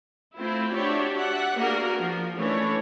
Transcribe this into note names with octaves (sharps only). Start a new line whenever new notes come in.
A3 C4 E4 F4
D4 F#4 G4 C#5 D5 E5
D5 E5 F#5
A#3 B3 D4 F#4 G#4 A#4
F3
E3 A3 C#4 D4 E4 C#5